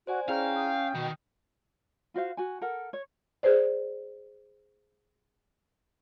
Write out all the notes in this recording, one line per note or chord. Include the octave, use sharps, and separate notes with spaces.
F#4 C5 D5 G#5
C#4 E4 G#4 F5 G5 A#5
D#6
B2 D#3
F4 F#4 C5 F5
F#4 G#5
A4 A#4 F#5
C#5
G#4 B4 C5 D5